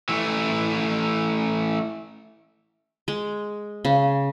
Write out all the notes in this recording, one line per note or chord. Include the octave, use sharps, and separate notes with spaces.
E3 A3
G#3
C#3